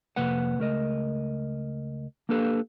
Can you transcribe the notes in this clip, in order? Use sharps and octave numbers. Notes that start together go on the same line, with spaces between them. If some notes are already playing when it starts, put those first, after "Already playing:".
F2 C3 A#3 B4 F#5
C#2 A3 A#4 D#5
A#3 D4 G4 A4 B4 F5